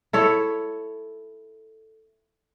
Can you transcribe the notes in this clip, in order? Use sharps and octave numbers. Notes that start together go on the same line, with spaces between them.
E4 A4 C#5